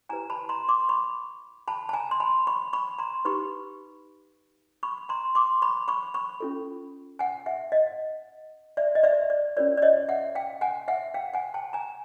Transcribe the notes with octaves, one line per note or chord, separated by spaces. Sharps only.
E4 G4 B4 G#5 A#5
A5 B5
A#5 C6
C6 D6
B5 C#6
A5 B5
A5
G#5 A#5
C6
A5 B5
B5 C#6
B5 C#6
A#5 C6
D#4 G4 B4 B5 C#6
B5 C#6
A#5 C6
C6 D6
B5 C#6
B5 C#6
B5 C#6
C#4 F4 A4
F#5 G#5
E5 F#5
D#5 F5
D5 E5
D#5
D5 E5
D5
C#4 F4 A#4 C#5 D5
D5
C#5 D#5
E5 F#5
F5 G5
F#5 G#5
E5 F#5
F5 G5
F#5 G#5
G5 A5
G#5 A#5